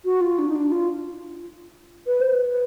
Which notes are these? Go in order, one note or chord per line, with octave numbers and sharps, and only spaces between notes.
F#4
F4
D4
D#4
D4
F4
B4
C5
B4